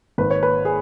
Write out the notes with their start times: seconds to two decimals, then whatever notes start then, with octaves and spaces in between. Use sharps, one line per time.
0.18 G#1 B4
0.31 C#5
0.43 B4
0.65 G#4